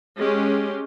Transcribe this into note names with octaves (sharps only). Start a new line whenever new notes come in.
G#3 C#4 G4